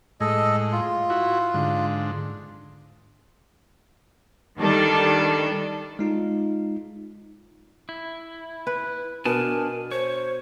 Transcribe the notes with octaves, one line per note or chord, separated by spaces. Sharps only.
A2 G#3 A4 D#5
F4
E4 F#4
G#2 D3
D#3 G3 D4 A4
G#3 D#4 F4
E4
B4
B2 D4 A#4 G#5 A5
C5 C#5